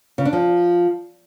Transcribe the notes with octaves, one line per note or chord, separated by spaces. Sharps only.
C#3
D4
F3